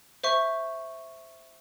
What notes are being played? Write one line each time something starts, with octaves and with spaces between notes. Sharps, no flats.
C5 E5 C#6